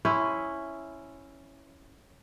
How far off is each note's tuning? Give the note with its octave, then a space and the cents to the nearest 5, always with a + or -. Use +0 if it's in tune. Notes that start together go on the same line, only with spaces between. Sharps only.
C#4 +0 E4 +0 C5 -15